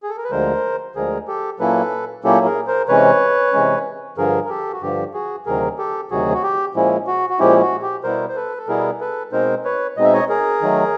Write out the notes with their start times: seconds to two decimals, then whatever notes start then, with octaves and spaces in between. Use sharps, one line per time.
0.03 G#4
0.10 A4
0.17 A#4
0.24 B4
0.31 D2 D3 F3 G#3 A#4 C5
0.96 D2 D3 F3 G#3 G#4 A#4
1.28 G4 A4
1.59 A#2 F#3 A#3 C#4 E4 A4 B4
2.24 A#2 F#3 A#3 C#4 E4 G4 A4
2.45 G#4 A#4
2.67 A#4 C5
2.89 C3 E3 G#3 C#4 B4 C#5
3.53 C3 E3 G#3 C#4
4.17 G2 D3 F3 G#4 A#4
4.45 A#4
4.49 G4 A4
4.73 F#4
4.82 G2 D3 F3 G4
5.14 F#4 G#4
5.46 D2 C3 D#3 F#3 G#4 A#4
5.78 G4 A4
6.11 D2 C3 D#3 F#3 F#4 G#4
6.34 F#4
6.43 G4
6.75 A#2 F3 G#3 C#4 E4
7.07 F#4
7.30 F#4
7.39 A#2 F3 G#3 C#4 E4 G4
7.61 F#4
7.82 G4
8.03 B2 G3 B3 E4 A#4 C5
8.29 C5
8.36 A4 B4
8.57 A4
8.68 B2 G3 B3 E4 G#4 A#4
9.01 A4 B4
9.32 B2 G#3 C4 D#4 A#4 C5
9.65 B4 C#5
9.97 B2 G#3 C4 D#4 D#5
10.05 E5
10.13 C#5 D#5
10.29 G#4 A#4
10.61 D#3 F#3 A3